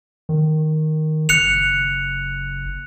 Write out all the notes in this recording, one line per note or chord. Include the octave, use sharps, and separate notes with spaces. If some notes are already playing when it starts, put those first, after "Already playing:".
D#3
F#1 F#6 C#7 F7